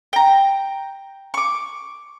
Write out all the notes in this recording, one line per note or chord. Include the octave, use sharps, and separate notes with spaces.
G5 A#5
C#6 D6